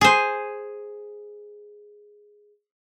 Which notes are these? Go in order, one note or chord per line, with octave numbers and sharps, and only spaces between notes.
G#4 C5